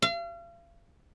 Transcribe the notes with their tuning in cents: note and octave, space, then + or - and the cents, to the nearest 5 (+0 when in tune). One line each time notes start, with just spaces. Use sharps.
F5 -40